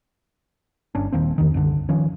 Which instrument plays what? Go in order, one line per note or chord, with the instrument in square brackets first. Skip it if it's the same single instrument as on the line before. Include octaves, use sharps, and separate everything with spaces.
[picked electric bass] G1 C#4 D4
D#1 D#3 A#3 C4
E2 D3 D#3
C2 F#2 D3
D#3 F3 C#4